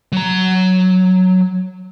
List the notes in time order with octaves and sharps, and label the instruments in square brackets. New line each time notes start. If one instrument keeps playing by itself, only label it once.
[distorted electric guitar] F#3 A#5